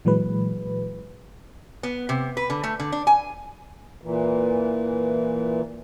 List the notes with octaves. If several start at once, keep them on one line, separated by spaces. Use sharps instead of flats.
A#2 E3 F#3 G#3 B4
B3
C3
B4
D3
A3
D3
D4
G#5
A#2 E3